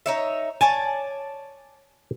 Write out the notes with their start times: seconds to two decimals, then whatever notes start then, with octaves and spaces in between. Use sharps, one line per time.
0.06 D#4 C#5 E5
0.61 C#5 D5 G#5 A5